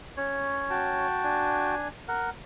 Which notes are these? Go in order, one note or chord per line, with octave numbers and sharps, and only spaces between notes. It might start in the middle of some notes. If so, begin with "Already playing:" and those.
C#4 C#5
F#4 G5 A5
D4 G#5
A#4 F#5